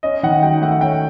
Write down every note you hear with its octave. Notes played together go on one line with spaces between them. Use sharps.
C#4 D#5
D#3 F#5
F#3 G5
A3 F#5
C#4 G5